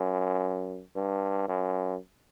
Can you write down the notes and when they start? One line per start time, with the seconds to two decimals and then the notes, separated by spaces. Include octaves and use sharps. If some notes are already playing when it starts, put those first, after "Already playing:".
Already playing: F#2
0.96 G2
1.48 F#2